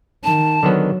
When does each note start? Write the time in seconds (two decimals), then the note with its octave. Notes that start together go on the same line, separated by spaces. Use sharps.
0.24 D#3 A5
0.63 D3 D#3 F#3 B3